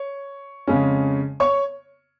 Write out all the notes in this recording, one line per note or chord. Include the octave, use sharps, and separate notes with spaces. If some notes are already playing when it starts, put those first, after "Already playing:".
Already playing: C#5
F2 C#3 G#3 C#4
C#5 C#6